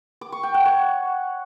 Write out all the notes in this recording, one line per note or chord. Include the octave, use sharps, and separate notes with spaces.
D6
C#6
G5
F#5
C#5